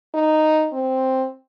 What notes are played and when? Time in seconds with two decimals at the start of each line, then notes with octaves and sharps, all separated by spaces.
0.14 D#4
0.73 C4